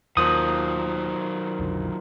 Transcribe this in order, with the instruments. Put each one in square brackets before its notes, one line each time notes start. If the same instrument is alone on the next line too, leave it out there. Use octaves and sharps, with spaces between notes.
[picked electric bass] D#2 [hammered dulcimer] A#2 F3 [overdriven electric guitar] D#3 F#3 [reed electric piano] D#6
[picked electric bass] B1 F2 D3